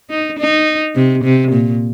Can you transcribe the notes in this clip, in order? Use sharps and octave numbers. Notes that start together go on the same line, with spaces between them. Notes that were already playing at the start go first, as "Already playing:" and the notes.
D#4
D#4
C3
C3
A#2